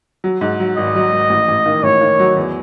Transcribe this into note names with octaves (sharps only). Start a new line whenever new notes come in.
F#3
G#2
F#3
G#1 D#5
F#3
G#1
A1
A1
D#3
A1 C#5
D#3
F#3
E2